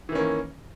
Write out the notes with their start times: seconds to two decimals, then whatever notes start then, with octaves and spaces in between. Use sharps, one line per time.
0.09 E3
0.12 D#3
0.15 C#4
0.18 A#3